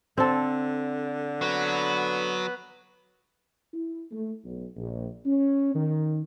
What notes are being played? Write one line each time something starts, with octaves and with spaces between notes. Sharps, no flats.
D3 C4 A4
F#3 B3 B4
E4
A3
B1
A#1
C#4
D#3